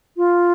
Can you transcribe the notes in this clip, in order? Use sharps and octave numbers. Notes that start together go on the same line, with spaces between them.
F4